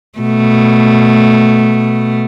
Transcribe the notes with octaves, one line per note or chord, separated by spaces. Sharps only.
B2 A3